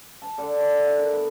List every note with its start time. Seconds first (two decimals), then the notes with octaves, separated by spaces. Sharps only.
0.22 A5
0.38 D3
0.60 D5
0.73 E5
0.86 F#5
0.98 A#4
1.13 B3